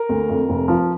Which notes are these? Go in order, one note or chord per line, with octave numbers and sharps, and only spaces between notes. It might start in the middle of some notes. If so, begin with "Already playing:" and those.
Already playing: A#4
D2
F2
F1
F3